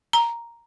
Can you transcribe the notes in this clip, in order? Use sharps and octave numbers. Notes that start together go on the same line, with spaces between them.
A#5